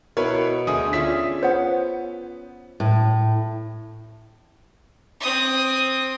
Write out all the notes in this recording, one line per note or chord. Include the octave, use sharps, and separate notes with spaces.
B2 E4 A#4 B4 C#5
D2 A3 D4 G#4 D#6
C#4 F4 G#4 D5 E5 B6
B3 C5 C#5 F#5
A2
C4 D#6